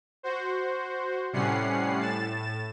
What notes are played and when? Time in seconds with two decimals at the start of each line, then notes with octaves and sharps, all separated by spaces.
0.23 F#4 C5
1.33 A2 C3 G3 C#4 F#5 C7
2.00 A2 A6 E7